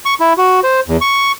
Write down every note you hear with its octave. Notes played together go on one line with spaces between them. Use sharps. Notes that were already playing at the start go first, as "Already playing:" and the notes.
C#6
E4
F#4
C5
E2
C#6